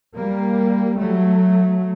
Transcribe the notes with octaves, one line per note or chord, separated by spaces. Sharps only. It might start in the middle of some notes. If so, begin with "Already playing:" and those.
G3 A#3
F#3 A3